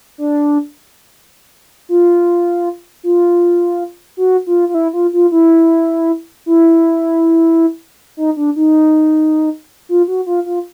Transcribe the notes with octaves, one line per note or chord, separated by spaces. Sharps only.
D4
F4
F4
F#4
F4
F4
E4
F4
F4
E4
E4
D#4
D4
D#4
F4
F#4
F4
F4